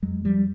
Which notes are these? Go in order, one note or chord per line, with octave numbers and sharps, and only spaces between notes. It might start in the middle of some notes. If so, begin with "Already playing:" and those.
F2 F#3 G#3
F3 G3